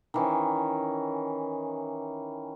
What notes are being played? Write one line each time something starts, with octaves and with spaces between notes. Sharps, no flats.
D#3 E3 C#4